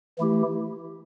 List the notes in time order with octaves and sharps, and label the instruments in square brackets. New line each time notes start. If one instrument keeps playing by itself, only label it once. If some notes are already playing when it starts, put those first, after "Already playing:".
[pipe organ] E3 A3 E4 G4